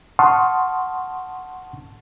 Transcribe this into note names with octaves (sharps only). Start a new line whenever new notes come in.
F#5 A5 C6 C#6 D#6 F6